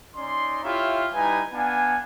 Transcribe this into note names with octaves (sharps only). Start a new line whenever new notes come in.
C#4 D#4 D5 C6
E4 F4 G4 C#5 E5 F5
G3 D#4 E4 B4 G#5
B3 D4 F5 G#5